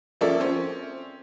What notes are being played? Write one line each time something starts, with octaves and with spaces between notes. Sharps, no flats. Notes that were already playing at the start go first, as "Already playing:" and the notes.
F3 A#3 C#4 A4 D5 E5
C4 C#4